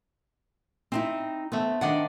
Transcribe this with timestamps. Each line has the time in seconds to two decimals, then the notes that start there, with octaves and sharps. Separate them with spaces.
0.92 C4 D#4 E4
1.52 A3 B3 C4
1.81 D#3 D4 D5 D#5 F#5